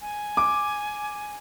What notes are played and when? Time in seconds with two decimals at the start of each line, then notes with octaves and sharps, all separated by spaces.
0.01 G#5
0.37 D6